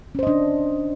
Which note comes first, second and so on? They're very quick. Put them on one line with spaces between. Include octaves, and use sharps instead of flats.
C#4 C5 D#5 D4